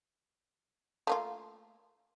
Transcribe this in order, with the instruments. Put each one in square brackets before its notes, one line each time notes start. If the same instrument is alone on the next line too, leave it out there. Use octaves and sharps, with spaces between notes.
[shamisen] A3 A#3 F4